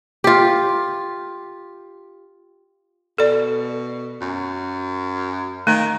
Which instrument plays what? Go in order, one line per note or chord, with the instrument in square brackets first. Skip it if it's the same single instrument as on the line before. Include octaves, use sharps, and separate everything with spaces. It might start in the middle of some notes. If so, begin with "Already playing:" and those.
[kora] F4 G4
[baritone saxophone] B2 [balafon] A4 D5
[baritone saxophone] F#2
[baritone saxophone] D#3 [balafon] A3